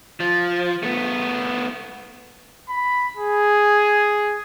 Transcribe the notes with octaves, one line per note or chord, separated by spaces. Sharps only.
F3
A3 B3
B5
G#4